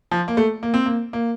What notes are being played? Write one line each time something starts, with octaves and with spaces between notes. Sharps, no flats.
F3
A#3
A3
A#3
C4
A#3
A#3